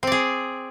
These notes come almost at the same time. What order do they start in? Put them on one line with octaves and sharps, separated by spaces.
C4 D5 G#4